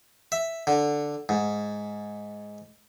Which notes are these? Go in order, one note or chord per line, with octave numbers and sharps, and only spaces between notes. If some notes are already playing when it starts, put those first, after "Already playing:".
E5
D3
G#2